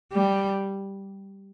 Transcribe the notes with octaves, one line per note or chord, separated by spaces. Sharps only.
G3